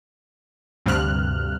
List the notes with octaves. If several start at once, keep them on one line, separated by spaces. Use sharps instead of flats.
D2 G2 C3 F6 F#6